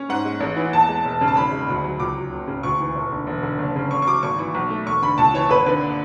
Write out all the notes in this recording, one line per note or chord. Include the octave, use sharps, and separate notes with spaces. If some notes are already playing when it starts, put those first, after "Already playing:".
Already playing: C#4
G#2 F#5
G#3
A1
E3
E2 A5
G#3
E1
C#3
A5
G#1 B5
G#3
D2
F#3
C#2 D6
F#3
F#1
C#3
D2 C#6
E3
E1
D3
E1
D3
F#1
C#3
A1 C#6
C#6
F#3 D6
G#1 C#6
E3
B1
A3
E1 C#6
D3 B5
C#2 A5
E3 C#5
G#1 B4
D3 B4